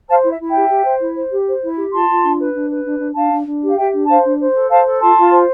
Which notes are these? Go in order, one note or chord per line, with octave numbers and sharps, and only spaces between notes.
C5 F5 A5
E4
E5
E4
E5 G5
G4
G4
C5
E4
C5
G4
C5
E4
G4
F4 A5 C6
F4
D4
B4
D4
B4
D4
D4
D4 F5 A5
D4
D4
G4
F5
G4 E5 G5
D4
C5 F5 A5
D4
C5
A4
C5 F5 A5
A4
F4 A5 C6
F4
C5